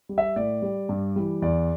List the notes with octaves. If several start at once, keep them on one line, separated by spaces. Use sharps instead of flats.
G3
E5
A2 D5
G3
G2
E3 G3
E2 D5